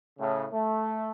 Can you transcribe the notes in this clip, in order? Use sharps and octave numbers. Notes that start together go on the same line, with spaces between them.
A2 C#3
A3